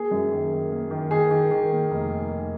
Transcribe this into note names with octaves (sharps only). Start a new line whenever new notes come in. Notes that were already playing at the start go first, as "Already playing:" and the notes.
Already playing: A#3 G#4
F#2
D#3
A#3
A#3
D#3
D#3 G#4
D#3
D#3
A#3
F1